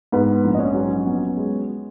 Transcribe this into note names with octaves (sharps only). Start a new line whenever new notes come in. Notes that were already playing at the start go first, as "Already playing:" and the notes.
G#2 B3 B4
A#1
D#5
C#4 C#5
F#3
B3
G#3